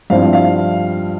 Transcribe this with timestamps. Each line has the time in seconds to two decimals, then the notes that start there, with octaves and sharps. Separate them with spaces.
0.10 G2 F3 C4 E4 F5
0.33 F5